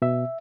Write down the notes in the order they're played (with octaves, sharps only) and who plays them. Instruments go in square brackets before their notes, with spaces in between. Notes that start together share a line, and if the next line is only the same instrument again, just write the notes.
[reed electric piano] B2 E5